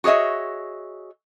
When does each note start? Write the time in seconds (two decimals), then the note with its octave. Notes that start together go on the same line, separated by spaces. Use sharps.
0.04 F#4 G#4 C#5 D#5 E5